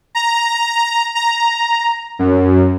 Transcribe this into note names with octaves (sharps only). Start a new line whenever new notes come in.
A#5
A#5
F#2